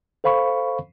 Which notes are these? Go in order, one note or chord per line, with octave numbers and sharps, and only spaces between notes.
A4 C5 F5 B5 C#6